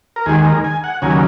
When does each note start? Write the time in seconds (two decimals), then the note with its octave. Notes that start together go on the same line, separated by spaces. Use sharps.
0.16 A#4
0.26 D#2 D#3 G#3 G#4
0.46 A#4
0.64 G#5
0.84 F#5
1.02 D#2 C#3 F#3 A#3 G#5